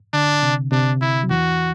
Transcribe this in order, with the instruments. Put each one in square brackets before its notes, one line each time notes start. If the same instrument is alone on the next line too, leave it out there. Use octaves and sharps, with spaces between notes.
[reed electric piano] D3 [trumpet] D4
[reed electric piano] C3
[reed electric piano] C3 [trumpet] D4
[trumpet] E4
[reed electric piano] F#3
[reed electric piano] E2 E3 [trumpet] F#4